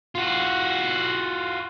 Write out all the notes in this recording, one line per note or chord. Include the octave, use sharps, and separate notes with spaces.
F4 F#4